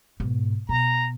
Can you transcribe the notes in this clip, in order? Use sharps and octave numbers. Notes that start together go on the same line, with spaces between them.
G#2 B2
B2 A#5